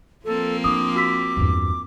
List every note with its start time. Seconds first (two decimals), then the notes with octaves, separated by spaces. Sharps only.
0.25 F3 A#3 C4 A4
0.64 D4 D6 D#6
0.96 F#4 E6 B6
1.37 E2 G2